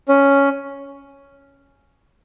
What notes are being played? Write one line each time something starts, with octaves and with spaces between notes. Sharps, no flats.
C#4